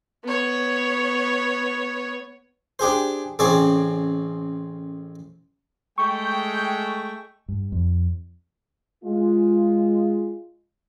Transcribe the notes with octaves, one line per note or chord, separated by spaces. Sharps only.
B3 C#5
D4 G4 G#4 C5
A1 C#3 C4 G#4 D5 C#6
G#3 A3 G5 C#6
G2
F2
G#3 F4